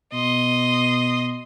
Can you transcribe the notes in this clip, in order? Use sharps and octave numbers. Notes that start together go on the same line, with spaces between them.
B2 D#5 C6